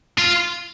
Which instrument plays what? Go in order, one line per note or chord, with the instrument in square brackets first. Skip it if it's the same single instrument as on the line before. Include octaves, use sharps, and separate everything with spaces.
[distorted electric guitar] F4